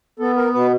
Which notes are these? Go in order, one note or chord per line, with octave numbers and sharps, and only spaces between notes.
B3 A4
A#4
B2 B4